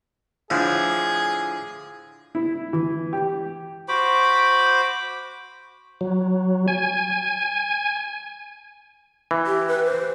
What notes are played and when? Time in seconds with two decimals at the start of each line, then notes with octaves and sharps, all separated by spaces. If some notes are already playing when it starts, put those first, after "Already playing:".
0.50 A2 D3 F3 G#4
2.35 E4
2.73 E3
3.13 G4
3.88 F#4 C5 B5 D6
6.01 F#3
6.68 G#5
9.31 E3
9.47 G4
9.68 B4
9.85 C5